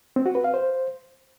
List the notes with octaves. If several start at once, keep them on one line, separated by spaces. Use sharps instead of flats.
C4
F#4
B4
F5
C5